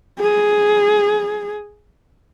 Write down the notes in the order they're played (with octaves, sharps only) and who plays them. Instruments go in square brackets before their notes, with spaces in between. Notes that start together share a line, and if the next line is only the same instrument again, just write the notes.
[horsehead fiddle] G#4